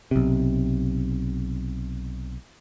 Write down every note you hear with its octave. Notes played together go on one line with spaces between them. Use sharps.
B1 C3